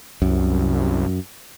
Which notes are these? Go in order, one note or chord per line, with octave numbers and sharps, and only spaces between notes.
C2 F#2